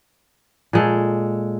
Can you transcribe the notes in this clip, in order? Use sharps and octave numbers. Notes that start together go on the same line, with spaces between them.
A#2 G#3 A4